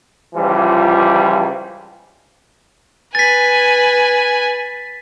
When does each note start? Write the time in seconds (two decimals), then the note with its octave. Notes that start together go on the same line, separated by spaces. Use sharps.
0.35 C#2 E3 F3 G3 F4
3.15 B4 G#5 A6 B6